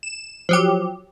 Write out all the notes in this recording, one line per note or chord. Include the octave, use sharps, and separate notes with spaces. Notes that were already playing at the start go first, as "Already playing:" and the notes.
E7
F3 F#3 G4